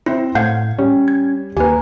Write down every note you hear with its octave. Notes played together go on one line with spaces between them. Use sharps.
C4 E4 C5
A2 F5 F#5 G6 G#6
G3 C#4
G#6
D#2 A#3 G4 B4 G#5